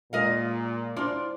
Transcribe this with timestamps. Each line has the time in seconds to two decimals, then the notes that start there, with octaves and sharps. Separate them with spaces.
0.13 A#2 G#3 A#4 D#5 F5
0.96 D4 E4 F4 C5 D5